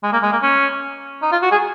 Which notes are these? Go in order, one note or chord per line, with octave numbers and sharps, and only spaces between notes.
G#3
A#3
G#3
A#3
C#4
D#4
F4
F#4
G#4